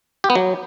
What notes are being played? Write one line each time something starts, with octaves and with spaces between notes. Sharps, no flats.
G4
B3
F#3